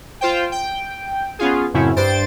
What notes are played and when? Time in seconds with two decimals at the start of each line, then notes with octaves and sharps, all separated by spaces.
0.21 F4 C5 G5
0.52 G5
1.39 B3 C#4 F4 G#4
1.74 F#2 A2 C#3 C4 C#4 E4
1.96 G2 C5 A6 D7